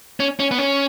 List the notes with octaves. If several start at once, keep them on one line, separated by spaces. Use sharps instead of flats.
C#4
C#4
B3
C#4